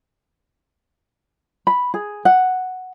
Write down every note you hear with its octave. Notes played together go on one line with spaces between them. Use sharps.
B5
G#4
F#5